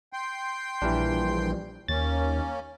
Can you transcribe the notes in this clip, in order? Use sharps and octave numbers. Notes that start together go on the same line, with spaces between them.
G5 C6
A#1 E3 G3 D4
D#2 A#3 C#4 A6